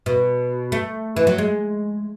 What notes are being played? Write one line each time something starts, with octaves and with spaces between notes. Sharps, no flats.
B2
A3
E3
F#3
G#3